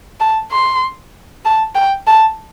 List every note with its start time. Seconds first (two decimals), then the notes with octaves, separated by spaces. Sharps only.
0.20 A5
0.52 C6
1.45 A5
1.75 G5
2.07 A5